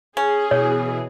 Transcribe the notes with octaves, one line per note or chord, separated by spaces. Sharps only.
C#4 G#4
B2 E3 C#5